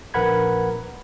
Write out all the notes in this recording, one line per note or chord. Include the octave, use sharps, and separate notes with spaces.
A#1 A#4 B4 F#5 B5 G#6